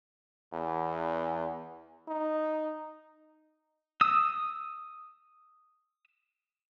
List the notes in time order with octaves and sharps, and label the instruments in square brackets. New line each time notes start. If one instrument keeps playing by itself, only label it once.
[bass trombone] E2
D#4
[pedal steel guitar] D#6 E6